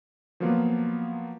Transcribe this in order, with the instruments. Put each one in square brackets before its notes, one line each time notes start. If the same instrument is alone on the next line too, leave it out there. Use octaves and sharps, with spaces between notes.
[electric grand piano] F3 F#3 A#3 B3 F4